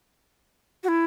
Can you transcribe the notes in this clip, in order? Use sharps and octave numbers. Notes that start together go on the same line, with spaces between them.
F#4
E4